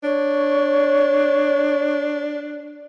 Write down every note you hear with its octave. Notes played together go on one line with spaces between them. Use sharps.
D4 C#5